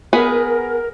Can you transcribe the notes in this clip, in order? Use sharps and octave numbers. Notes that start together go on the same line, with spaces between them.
B3 G#4 A#4 B4